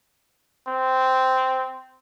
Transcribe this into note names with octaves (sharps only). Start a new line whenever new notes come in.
C4